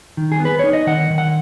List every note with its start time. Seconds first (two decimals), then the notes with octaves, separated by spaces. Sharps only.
0.17 D#3
0.32 G#4
0.40 B3
0.45 B4
0.59 D#4 C#5
0.73 D#5
0.87 D#3 F#5
1.10 D#3
1.18 F#5